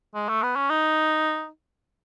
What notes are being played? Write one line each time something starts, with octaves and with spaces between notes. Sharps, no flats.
G#3
A3
B3
C#4
D#4